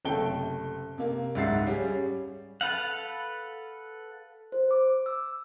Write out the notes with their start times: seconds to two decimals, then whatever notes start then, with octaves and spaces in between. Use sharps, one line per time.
0.05 F#1 C3 A3 A4 G5 G7
0.98 C3 A#3
1.35 C#2 G#2 E5 F#5 A6 C7
1.66 G3 C#4 G#4
2.61 A4 B4 F5 F#5
4.52 C5
4.71 D6
5.06 E6